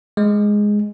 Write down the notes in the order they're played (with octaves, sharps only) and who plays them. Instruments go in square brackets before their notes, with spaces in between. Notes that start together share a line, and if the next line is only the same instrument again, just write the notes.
[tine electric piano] G#3